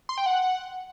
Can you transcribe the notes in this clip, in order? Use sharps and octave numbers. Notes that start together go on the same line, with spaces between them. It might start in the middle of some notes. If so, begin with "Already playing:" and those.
C6
G5
F#5